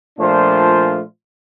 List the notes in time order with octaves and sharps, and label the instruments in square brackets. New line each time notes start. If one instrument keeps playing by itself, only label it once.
[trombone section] A#2 F3 A3 D4 F4 C5